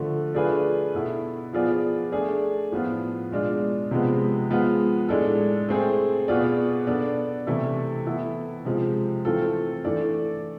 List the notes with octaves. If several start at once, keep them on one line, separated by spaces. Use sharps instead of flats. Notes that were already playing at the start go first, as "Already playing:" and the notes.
Already playing: D3 F3 A3
A3 D4 F4 G#4 B4
B2 B3 E4 A4
F3 B3 F4 G#4 D5
A3 D4 G#4 D5
A2 F3 B3 F4
B2 G#3 D4 F4
C3 F3 G#3 B3
F3 G#3 B3 F4
A2 G#3 D4 A4
A3 C4 G#4 C5
B2 B3 F4 G#4 D5
B3 D4 A4 D5
C3 E3 A3 E4 A4
E3 B3 E4 A4
C3 F3 G#3
E3 A3 C4 F4 A4
E3 A3 D4 A4 D5